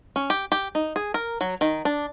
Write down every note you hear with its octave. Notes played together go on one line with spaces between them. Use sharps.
C#4
G4
G4
D#4
G#4
A#4
F#3
D#3
D4